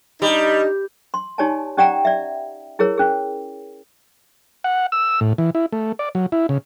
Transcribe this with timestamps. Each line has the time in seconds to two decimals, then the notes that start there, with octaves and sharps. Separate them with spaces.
0.22 G3 D4 D#4
1.14 C6
1.38 D#4 G4 C#5 D5 G#5 A5
1.77 C#4 G4 D5 F#5 G5 A#5
2.05 D5 E5
2.79 E4 G#4 A#4 C#5
2.97 C#4 G#4
4.64 F#5
4.92 E6
5.21 A2
5.38 E3
5.55 E4
5.72 A3
5.99 D5
6.15 F#3
6.32 E4
6.49 C#3